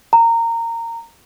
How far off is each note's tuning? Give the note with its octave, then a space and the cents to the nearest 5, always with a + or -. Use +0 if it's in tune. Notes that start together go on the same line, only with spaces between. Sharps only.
A#5 -20